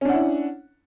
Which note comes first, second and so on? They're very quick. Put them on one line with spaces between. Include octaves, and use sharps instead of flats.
C#4 D4 F#5 E4